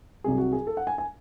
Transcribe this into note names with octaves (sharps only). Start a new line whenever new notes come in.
C2 C3 F#3 G#4
F#4
G#4
A4
F#5
G#5
G#5